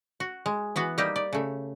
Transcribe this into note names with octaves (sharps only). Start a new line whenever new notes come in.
F#4
G#3
E3 B3 F#4
G3 A#3 D#4 G4
D5
C#3 A3